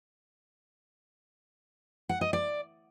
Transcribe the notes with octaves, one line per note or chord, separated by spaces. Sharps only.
F#5
D#5
D5